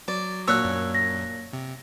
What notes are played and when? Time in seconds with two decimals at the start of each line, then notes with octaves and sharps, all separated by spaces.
0.08 F#3 D5
0.48 A#2 D4 F#4 C#5 E6 F#6
0.64 F#2
0.95 A#6
1.53 C3